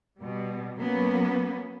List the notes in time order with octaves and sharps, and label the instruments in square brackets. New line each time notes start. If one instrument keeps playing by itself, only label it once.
[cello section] B2 G3
F#3 A#3 B3 C#4 B4